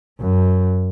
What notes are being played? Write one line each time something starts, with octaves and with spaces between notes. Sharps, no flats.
F#2